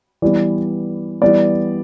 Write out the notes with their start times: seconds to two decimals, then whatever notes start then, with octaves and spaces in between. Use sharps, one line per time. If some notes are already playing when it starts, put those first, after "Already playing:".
0.22 E3 G3 B3 D5
1.22 E3 G3 B3 D5